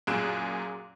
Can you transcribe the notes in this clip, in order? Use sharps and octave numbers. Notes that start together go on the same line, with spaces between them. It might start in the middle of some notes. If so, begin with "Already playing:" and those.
F#2 A#2 G#4 F#6 D7 E7